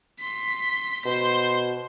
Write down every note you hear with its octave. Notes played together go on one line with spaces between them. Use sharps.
C6 B6
B2 C5 C6